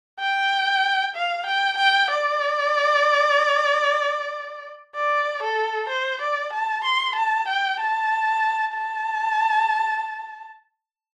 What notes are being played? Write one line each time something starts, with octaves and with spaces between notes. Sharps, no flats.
G5
F5
G5
G5
D5
D5
A4
C5
D5
A5
C6
A5
G5
A5
A5